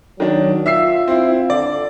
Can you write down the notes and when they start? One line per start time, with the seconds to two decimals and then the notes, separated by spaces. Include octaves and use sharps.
0.20 D#3 F#3 D4
0.66 F4 E5 E6 C7
1.08 C4 E4
1.50 D3 D5